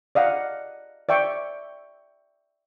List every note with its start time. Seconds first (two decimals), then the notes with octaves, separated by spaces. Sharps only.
0.15 D5 D#5 F5 F#5
1.09 D5 E5 G5 C#6